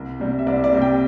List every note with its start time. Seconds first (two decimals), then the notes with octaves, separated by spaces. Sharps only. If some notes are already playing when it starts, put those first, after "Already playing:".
Already playing: C2
0.20 C3 G3
0.39 E5
0.46 C2 D5
0.64 D5
0.72 C3 G3
0.82 G5